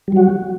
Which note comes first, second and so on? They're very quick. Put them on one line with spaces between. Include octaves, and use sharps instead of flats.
G3 F#3 F#4